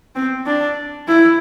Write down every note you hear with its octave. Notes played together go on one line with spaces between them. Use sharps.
C4
D4
E4